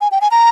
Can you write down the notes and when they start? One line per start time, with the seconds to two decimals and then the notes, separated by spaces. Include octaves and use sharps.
0.01 G#5
0.12 G5
0.21 G#5
0.31 A#5